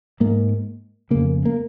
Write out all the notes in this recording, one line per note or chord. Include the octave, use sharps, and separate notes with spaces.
G#2 A#3
F2 C#3 A#3
A#3